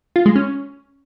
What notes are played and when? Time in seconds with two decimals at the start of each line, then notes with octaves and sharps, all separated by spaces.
0.16 F4
0.26 G#3
0.36 C#4